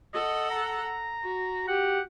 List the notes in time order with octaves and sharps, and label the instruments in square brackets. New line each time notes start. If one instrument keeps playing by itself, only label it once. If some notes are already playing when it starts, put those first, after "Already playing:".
[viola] A4 F#5 [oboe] D#5
[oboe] A#5
[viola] F#4
[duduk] G4 [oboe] F#5